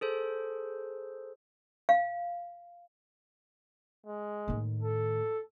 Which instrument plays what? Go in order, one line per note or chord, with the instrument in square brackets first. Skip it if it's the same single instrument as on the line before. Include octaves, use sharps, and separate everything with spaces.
[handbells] G#4 A4 C5
[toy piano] F5
[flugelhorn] G#3
[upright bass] A2 D#3
[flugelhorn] A4